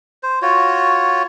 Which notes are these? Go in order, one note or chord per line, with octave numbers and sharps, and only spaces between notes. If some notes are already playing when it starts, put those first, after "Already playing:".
C5
F4 F#4 C#5